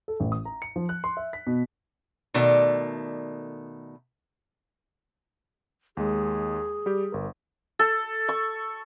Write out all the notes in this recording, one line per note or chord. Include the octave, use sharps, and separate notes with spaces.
A4
A1
D#6
A#5
C#7
F3
F#6
C6
E5
B6
B2
B2 D#3 A3 D5
D#2 G#3 G#4
G3 G4
G1 A#4
A4
C#6